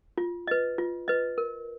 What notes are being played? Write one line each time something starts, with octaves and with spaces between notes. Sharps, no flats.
F4
B4 D#5
F4
B4 D#5
A#4